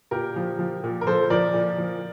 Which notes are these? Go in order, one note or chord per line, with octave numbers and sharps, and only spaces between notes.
A#2 G4 A#4
F3
F3
A#2
A#4
F3 A4 C5
F3 A#4 D5
A#2
F3